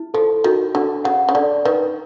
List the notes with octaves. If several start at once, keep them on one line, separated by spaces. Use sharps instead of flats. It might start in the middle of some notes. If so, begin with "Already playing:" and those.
Already playing: E4
F3 A4
D#3 F#4
D3 D4
C#3 F#5
C#3
D3 D5
D#3 B4